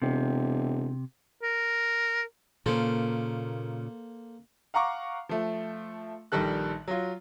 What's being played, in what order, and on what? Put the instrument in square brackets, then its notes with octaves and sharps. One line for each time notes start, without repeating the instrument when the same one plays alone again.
[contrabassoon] E1 [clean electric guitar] C3
[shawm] A#4
[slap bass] A#2 C#3 [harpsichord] A#3 A4 C5
[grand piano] F5 F#5 A#5 C#6 D6
F3 A3
A#1 D#3 G3 A4 F#6
F#3 F4